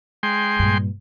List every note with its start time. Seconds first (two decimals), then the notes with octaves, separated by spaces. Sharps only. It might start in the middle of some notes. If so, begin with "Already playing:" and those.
0.23 G#3 G5 C6
0.59 G2 A#2